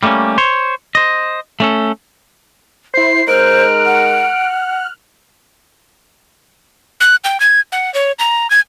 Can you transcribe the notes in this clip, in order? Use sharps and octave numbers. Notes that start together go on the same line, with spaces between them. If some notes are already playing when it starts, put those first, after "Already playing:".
G3 A3 A#3 C4 C#4
C5 C#5
C5 D#5
A3 C#4 A4
E4 C5 C7
G#3 D#4 A#4 C5 F6 F#6 D7
F#5
F#6
G5
G#6
F#5
C#5
A#5
G#6